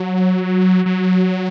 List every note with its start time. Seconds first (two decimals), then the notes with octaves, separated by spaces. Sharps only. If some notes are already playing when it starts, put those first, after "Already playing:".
Already playing: F#3
0.86 F#3